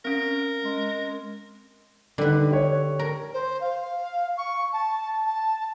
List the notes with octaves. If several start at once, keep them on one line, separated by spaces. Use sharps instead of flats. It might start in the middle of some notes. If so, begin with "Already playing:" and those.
C4 C#4 A#4
G#3
D3 D#3 G3 B4
G4 C#5
A#4
C5
F5
C#6
A5
A5